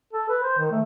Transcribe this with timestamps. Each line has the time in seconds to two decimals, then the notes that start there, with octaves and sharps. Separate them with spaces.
0.13 A4
0.29 B4
0.43 C5
0.58 D#3
0.71 A3